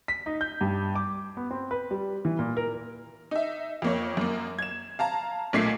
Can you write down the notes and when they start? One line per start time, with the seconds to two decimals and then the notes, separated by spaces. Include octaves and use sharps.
0.08 B6
0.26 D#4
0.41 G6
0.61 G2
0.96 D6
1.37 B3
1.51 C4
1.71 B4
1.91 G3
2.25 E3
2.39 A#2
2.57 A#4
3.31 D#4 E5
3.82 F2 A#3 C#5
4.17 F#2 A#3
4.59 G#6 E7
4.99 F5 A5 A#5
5.53 B1 A#2 A3 B6 C7